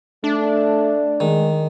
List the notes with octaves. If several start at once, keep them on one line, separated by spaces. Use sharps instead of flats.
A3 D4
D#3 G#3